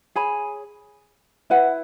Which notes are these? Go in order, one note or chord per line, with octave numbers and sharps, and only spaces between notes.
G#4 C#5 G#5 B5
E4 B4 F#5